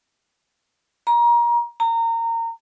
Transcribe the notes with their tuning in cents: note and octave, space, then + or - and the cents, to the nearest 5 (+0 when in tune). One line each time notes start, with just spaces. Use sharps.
A#5 +25
A#5 -25